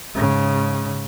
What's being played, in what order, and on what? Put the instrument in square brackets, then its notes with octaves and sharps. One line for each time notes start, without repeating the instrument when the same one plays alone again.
[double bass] G#2 C#3